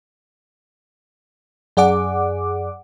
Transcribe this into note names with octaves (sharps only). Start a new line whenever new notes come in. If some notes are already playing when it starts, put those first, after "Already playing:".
F#2 G#4 D5 F#5 D6